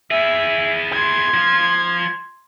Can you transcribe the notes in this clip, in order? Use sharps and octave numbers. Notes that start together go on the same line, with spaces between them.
E4 G#4 E5
C6 G#6
F3